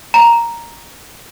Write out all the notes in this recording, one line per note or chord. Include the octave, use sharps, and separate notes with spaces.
A#5